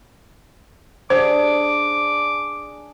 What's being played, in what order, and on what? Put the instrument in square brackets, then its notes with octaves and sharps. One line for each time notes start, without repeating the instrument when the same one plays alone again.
[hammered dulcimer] D4 G#4 [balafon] C5 [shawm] D6